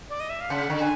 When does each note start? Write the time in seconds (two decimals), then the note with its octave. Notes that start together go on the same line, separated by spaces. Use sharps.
0.10 D5
0.20 D#5
0.30 E5
0.41 F5
0.50 C#3 F#5
0.70 D3
0.80 G#5